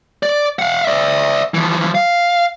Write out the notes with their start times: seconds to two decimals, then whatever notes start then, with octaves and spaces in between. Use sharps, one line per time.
0.23 D5
0.59 F5 F#5
0.84 D5 E5
1.54 E3 F3
1.95 F5